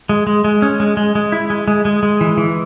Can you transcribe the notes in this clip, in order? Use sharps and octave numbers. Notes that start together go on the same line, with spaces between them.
G#3
G#3
G#3
C#4
G#3
G#3
G#3
E4
G#3
G#3
G#3
G#3
E3
E3